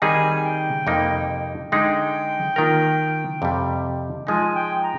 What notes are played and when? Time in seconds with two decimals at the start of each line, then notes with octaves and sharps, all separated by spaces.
0.02 D#3 G3 C4 D#4 G#4 G#5
0.44 G5
0.87 F2 C3 G3 A#3 D#4
1.72 D3 G#3 D#4 G#4 G5
2.56 D#3 A#3 F4 A#4
3.42 F2 C3 G3
4.27 F3 G#3 D#4 G#5
4.55 G5
4.83 A#5